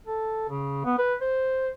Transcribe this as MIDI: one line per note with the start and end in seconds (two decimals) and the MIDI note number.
0.07 0.48 69
0.49 0.82 49
0.85 0.96 59
0.98 1.15 71
1.21 1.69 72